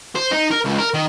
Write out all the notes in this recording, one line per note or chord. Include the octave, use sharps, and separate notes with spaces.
C5
D#4
A#4
C#2
A#4
D#3